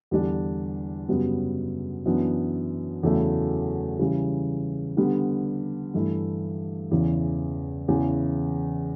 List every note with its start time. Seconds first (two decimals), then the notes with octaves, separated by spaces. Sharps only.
0.11 E2 D3 G3 D4
1.08 F#2 C#3 G3 B3
2.05 F#2 E3 B3 D4
3.03 E2 C#3 F#3 A3 E4
3.99 C#3 E3 G3
4.97 D3 G3 B3
5.94 G2 E3 A3 E4
6.91 E2 C#3 E3
7.88 E2 C#3 E3